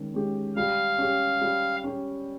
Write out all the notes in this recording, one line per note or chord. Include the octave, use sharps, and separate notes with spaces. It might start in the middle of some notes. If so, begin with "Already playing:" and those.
Already playing: D#3 G#3 C#4
G#3 C#4 G4
G3 F5
C#4 G4
G3
C#4 G4